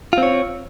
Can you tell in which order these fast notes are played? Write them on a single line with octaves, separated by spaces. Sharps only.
F4 C4 C#5